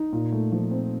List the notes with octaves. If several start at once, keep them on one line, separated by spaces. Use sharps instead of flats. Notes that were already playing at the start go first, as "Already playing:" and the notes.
Already playing: D#4
A#2
A3
F3
C4